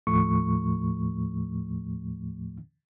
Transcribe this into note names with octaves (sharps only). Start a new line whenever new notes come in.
D#2 A2 F3 A3 C#6